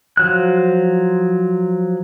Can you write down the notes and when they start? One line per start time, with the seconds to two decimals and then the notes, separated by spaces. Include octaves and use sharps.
0.17 F3 F#3 F#6